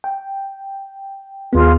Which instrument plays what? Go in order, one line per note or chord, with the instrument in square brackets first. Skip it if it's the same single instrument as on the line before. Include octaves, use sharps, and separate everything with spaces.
[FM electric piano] G5
[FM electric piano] D#2 B3 [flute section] F4 G#4